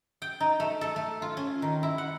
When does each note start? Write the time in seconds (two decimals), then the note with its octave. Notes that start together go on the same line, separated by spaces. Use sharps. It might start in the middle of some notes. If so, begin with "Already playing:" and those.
0.22 G5
0.40 D#4
0.60 A3
0.81 A4
0.96 A3
1.22 F4
1.37 C#4
1.62 D#3
1.83 E4
1.98 F#5